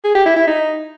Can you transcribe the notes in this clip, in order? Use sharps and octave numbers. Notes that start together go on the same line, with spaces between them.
G#4
G4
E4
E4
D#4